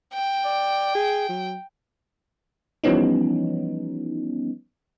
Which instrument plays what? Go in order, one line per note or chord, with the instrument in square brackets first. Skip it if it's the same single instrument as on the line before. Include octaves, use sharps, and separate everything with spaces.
[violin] G5
[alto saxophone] D5
G#4
F#3
[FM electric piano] E3 F3 G3 B3 C#4 D#4